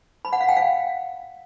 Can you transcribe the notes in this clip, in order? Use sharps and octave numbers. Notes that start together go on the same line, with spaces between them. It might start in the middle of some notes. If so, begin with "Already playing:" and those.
B5
F#5
F5
G5
F5